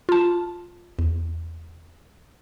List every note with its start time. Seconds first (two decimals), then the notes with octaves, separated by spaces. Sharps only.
0.09 F4 A5
0.99 E2